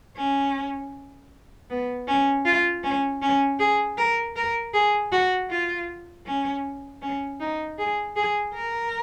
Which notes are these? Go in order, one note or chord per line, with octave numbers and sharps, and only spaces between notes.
C#4
B3
C#4
F4
C#4
C#4
G#4
A#4
A#4
G#4
F#4
F4
C#4
C#4
D#4
G#4
G#4
A#4